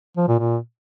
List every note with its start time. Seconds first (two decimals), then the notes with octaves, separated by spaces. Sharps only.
0.17 F3
0.28 A#2
0.39 A#2